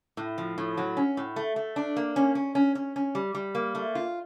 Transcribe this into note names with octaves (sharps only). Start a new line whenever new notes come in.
A2
F3
A2
F#3
C#4
A2
A3
A3
D4
A#3
C#4
C#4
C#4
C#4
C#4
G3
G3
A#3
A3
F4